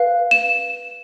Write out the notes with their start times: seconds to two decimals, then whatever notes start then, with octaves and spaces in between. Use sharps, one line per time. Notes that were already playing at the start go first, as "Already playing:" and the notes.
Already playing: B4 F5
0.31 E7